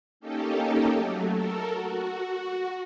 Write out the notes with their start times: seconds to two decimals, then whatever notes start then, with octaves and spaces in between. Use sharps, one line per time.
0.20 A#3 C#4 D#4 G4 A4
0.93 F#3 A3
1.28 A4 A#4
1.69 F#4